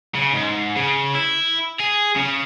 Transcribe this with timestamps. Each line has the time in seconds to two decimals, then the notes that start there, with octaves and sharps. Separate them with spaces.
0.15 C#3
0.34 G#2
0.76 C#3
1.14 E4
1.80 G#4
2.16 C#3